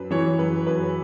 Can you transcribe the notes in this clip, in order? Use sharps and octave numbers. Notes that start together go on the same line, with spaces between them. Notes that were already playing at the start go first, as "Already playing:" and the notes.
Already playing: F#2 B4
E3 C#5
F#2 B4
F#2 B4